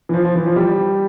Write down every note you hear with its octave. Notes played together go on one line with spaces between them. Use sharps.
E3
F3
F3
E3
F3
G3